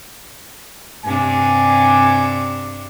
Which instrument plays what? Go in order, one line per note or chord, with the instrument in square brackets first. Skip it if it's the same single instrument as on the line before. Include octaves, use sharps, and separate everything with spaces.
[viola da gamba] G2 C3 D4 [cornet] G#5